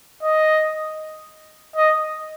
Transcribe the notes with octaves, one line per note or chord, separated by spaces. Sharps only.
D#5
D#5